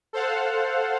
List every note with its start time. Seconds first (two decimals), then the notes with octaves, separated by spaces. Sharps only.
0.13 A4 C5 F5 F#5